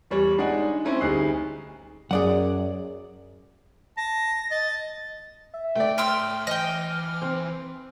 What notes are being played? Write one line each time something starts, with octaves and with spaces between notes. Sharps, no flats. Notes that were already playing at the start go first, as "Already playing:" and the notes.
E2 G3 C#5
G#3 D4 D#4 D#5 F#5 G#5
C4 C#4 E4
D2 G3 D#4 G#4 F#6 C7
F#2 F#3 G#4 D5 F#5
A5 A#6
D#5 A6
E5
A3 D5 G5
C#5 E5 G5 C6 E6 F6
E3 D#5 G5
C4